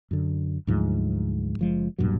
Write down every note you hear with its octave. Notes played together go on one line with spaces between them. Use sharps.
F#2 D3
D2 G#2 F3 F#3
F#1 F3 G#3
E1 G2 A#2 F#3